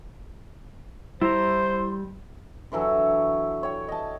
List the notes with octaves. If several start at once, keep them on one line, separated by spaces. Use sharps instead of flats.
G3 E4 C5 A#5 C6
D3 E3 F#3 A4
C#5 G5
D#5 A5